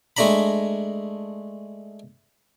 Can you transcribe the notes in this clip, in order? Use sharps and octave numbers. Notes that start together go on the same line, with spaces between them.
G#3 A3 D4 A#5 B5